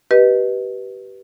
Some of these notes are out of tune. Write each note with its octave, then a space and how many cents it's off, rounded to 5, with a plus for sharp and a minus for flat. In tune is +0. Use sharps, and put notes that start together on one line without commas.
G4 -25 B4 -15 D#5 +0